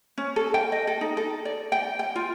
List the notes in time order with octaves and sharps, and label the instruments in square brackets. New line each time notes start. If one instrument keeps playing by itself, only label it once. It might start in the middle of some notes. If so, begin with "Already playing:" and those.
[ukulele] C#4
A4
G5
D#5
A4
D#4
A4
D5
G5
G5
F4